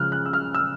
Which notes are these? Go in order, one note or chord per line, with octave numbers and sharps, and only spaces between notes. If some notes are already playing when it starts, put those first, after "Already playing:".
Already playing: C#3 F3 G#3 F6 F#6
F#6
E6
F6
E6